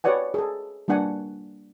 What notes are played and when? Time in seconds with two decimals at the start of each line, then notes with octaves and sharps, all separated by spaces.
0.04 G4 B4 C#5 D5 F#5 G#5
0.34 G#4 A4
0.88 G3 A#3 D4 F#5 G#5